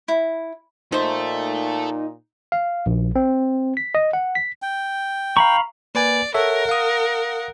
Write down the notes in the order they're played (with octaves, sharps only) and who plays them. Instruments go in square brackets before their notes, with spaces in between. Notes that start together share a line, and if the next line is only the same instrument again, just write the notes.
[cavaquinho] E4
[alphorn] A#2 [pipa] F3 C5 [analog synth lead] D#4 [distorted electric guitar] A4 E5
[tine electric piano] F5
A#1
C4
B6
D#5
F#5
B6
[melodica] G5
[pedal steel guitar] F5 B5 C#6 [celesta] A#5
[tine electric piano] A#3 B4 G#5 [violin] D5
[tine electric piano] A4 C#5 E5 [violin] A#4 F#5
[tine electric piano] F5 D#6